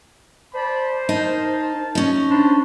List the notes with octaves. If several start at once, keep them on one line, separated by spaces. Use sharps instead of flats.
C5 D5 A5 B5
D#4 A#4 A5
C#4 D#4
D4 C5 A5 B5